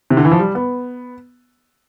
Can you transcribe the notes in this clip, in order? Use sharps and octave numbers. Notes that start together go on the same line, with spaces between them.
C3
D3
E3
F3
G3
B3